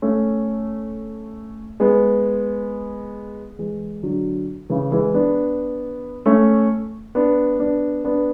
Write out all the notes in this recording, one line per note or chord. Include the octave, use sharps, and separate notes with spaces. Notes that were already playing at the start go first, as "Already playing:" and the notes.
A3 C#4
G#3 B3
E3 G#3
D3 F#3
C#3 E3
E3 G#3
B3 D4
A3 C#4
B3 D4
B3 D4
B3 D4